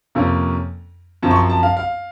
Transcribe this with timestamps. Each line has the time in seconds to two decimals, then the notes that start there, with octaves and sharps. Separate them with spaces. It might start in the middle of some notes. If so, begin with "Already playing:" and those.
0.15 F2 C3 F3 A#3 C#4
1.23 F#2 F3 C4 A5
1.31 C#6
1.36 C6
1.50 A5
1.63 F5
1.77 F5